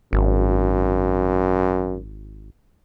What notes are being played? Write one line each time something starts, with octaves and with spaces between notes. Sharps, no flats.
G#1 F#2